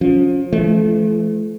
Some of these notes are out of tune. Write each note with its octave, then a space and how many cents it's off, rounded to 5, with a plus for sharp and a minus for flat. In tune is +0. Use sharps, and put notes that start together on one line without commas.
F3 +30 C#4 +10
E3 +40 A3 -35